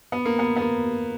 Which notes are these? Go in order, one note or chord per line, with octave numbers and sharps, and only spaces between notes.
B3
A#3
B3
B3
A#3